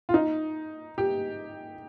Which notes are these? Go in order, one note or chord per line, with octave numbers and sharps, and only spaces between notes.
F4
D#4
G4